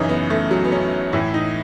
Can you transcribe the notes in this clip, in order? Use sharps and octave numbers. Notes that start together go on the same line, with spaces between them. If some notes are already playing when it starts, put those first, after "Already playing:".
Already playing: F#2 C#3 E3 D#4
B3
A3
F#3
B3
C#4
A2 E3 E4
D#4